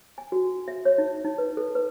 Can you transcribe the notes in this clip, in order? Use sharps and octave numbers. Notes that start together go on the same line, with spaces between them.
G#5
F#4
E5
C#5
D#4
D#4
B4
A4
B4